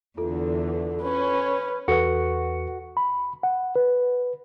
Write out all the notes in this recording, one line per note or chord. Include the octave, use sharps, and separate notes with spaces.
E2 D3 F4 A4
C#4 B4
E2 F#4 A4 B4 F#5
B5
F#5
B4